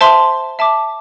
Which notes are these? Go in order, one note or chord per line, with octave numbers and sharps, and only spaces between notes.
C5 E5 A5 C6
E5 A5 D6